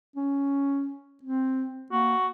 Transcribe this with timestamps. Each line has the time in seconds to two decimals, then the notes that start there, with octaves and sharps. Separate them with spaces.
0.16 C#4
1.23 C4
1.92 A#3 F#4